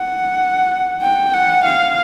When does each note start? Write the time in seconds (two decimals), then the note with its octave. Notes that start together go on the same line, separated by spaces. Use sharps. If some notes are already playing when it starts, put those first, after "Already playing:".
Already playing: F#5
1.02 G5
1.34 F#5
1.65 F5